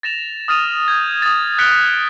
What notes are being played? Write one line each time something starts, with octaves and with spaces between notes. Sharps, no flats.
A6 A#6 E7 F7
D#6 F6 A6 D#7 F7
G6 G#6
D#6 A6
F#6 B6 C#7 D7 F7 G7